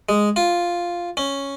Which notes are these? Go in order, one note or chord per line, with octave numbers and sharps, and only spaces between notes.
G#3
F4
C#4